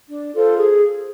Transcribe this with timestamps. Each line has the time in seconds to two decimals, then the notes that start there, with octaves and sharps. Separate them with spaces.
0.08 D4
0.33 F4 A4 C5
0.57 G#4